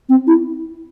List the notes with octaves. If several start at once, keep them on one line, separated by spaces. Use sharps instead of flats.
C4
E4